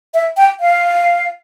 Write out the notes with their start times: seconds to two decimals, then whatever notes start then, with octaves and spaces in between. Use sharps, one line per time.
0.14 E5
0.37 G5
0.60 F5